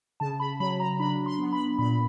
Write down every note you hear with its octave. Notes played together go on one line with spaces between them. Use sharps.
C#3 A5
B5
F#3 B5
A#5
D4 B5
C6
B3
B5
A#2 B5